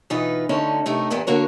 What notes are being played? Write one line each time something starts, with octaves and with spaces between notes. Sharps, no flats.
B2 E3 D#4 F4 B4
D2 D3 C#4 D#4 A5
C3 A3 D#4 A#4
E2 G2 A#2 A#3 B3
D3 A#3 F#4 A#4 C#5